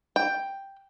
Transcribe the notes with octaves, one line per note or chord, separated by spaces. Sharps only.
G5